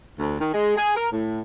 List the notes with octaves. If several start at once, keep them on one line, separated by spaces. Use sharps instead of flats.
D2
D#3
G#3
G#4
A#4
A2